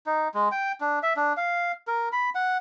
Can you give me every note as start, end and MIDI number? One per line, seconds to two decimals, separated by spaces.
0.06 0.28 63
0.34 0.48 56
0.52 0.72 79
0.81 0.99 62
1.03 1.13 76
1.17 1.33 62
1.37 1.72 77
1.87 2.09 70
2.12 2.30 83
2.35 2.58 78